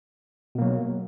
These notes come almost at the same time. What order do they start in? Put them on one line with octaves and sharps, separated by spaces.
B2 A#3 F#3